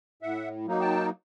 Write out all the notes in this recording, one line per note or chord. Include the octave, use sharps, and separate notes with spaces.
A2 E5 F#5
F#3 A#3 D#4
G5 A5